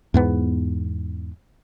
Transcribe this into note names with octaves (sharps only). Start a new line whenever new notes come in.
E2 G#2 B3